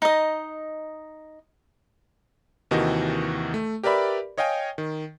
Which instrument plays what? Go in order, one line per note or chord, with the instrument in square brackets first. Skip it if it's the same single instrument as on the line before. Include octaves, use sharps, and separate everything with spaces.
[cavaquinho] D#4 D#5
[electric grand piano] D#2 C3 D#3 E3 F#4 D#5
A3
G4 A#4 B4 D5 E5 B5
C#5 D#5 F5 G5 G#5
D#3